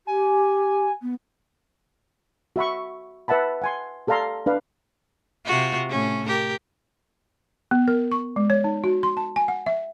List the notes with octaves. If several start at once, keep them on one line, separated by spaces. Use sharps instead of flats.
G4 G#5
B3
F#4 E5 B5 C#6
B4 E5 F#5 A5 B5
F#5 G#5 C6
G4 A4 D5 F5 A#5 C6
D4 B4 F5
C3 F4 F#4
A2 C#4
G4 A#4
B3
A#4
C#6
G#3
C#5
D#4
F#4
C6
A5
G#5
F#5
E5